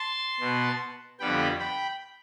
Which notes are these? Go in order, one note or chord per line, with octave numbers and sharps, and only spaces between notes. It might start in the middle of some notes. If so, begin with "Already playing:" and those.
Already playing: A5 C6
B2 B3
F2 D3 G3 B3 G5 B5
G5 B5